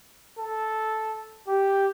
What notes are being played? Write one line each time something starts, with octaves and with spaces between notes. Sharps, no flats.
A4
G4